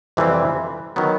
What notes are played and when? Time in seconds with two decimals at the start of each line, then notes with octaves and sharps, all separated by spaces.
0.17 F2 C3 E3 G3 C4
0.96 D#3 F#3 B3